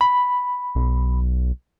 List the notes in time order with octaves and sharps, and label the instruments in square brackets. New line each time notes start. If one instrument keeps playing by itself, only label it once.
[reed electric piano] B5
[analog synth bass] B1